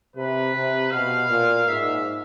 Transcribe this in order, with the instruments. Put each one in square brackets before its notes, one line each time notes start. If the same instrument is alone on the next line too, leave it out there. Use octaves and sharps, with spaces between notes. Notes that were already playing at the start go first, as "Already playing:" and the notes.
[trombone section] C3 [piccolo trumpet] B4
[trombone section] C3
[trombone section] B2 [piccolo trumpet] F5
[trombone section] A#2
[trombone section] G#2 [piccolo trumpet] E5